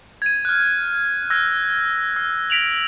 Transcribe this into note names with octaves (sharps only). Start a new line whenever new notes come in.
G#6 D#7
F6 F#6
E6 F#6 G#6 A#6
E6
A#6 B6 D7 F7 F#7